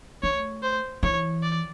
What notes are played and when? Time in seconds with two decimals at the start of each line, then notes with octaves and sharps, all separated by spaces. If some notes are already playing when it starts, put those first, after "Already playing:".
0.23 A3 C#5
0.63 C5
1.03 E3 C#5
1.43 D5